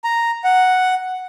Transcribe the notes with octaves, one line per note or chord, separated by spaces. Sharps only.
A#5
F#5